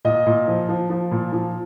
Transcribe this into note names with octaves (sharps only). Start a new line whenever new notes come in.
A#2 D#5
A#2
F3
F3
F3
A#2
F3